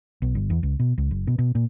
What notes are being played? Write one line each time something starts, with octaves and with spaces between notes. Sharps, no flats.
B1
G1
E2
C#2
B2
C#2
F#1
B2
B2
A#2